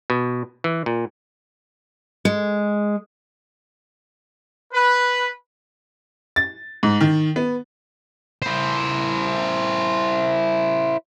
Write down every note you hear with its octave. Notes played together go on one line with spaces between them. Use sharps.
B2
E3
A#2
G#3
B4
A6
G#2
D#3
B3
E4 C5